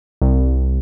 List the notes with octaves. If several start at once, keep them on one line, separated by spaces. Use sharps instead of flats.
C2